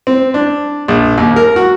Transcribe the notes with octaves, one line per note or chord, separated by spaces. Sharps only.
C4
D4
A#1
D#2
A#4
F#4